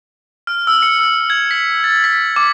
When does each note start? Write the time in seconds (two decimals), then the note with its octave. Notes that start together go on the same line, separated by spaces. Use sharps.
0.47 F6
0.67 E6
0.82 C#7
0.99 E6
1.30 G#6
1.51 B6
1.84 A6
2.04 B6
2.36 D6